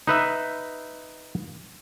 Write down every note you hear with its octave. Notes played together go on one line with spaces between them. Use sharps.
D#4 B4 E5